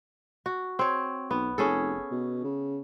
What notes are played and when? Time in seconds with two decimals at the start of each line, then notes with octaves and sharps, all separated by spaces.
0.46 F#4
0.79 C4 C#5
1.31 B1 B3
1.58 F1 C#4 G#4 A4
2.11 B2
2.44 C#3